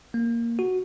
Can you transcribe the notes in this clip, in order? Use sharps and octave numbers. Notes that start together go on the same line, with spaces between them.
A#3
F#4